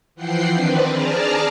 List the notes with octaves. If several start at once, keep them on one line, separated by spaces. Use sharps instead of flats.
E3 F3 F#5 G5 C7
D#3 C4 D4 B4 C5
G#4 D5 A5 A#5 F6